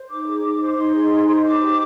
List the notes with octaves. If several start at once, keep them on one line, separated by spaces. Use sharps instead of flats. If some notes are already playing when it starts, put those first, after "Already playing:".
Already playing: C5
D#4 D6
G#4
D#4
C5
D#4 C6
G#4
D#4
C5
D#4 D6
G4